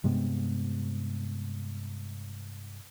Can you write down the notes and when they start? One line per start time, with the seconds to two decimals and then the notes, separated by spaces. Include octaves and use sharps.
0.04 G2 C3 G#3 B3